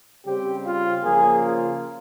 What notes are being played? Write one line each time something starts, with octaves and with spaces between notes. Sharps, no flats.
C#3 G3 C4 G4
F4
C#3 F3 A#3 G#4
F4